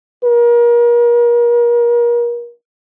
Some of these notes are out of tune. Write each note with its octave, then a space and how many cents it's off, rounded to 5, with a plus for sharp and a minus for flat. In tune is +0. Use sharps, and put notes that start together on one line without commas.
A#4 +35